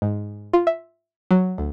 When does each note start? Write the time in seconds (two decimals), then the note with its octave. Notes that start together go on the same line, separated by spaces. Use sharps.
0.02 G#2
0.53 F4
0.67 E5
1.31 F#3
1.58 D2